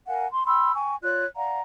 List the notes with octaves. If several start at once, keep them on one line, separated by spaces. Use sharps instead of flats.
A#4 F5 F#5 G#5
C6
G5 B5 C6 E6
G5 G#5 C#6
F4 C#5 D5 F#6
D5 F5 F#5 A#5